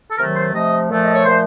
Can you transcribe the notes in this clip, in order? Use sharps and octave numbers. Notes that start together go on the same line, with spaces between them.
A4
C3 D#3 F#3 A3 A#4
C5
C3 F3 A3 D#5
A#2 F3 A3
D#5
C#5
A#2 F3 A3 C5